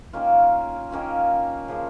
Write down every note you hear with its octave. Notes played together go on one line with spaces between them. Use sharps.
D#3 A#3 C#4 F4
D#3 A#3 C#4 F4
C#3 F3 A#3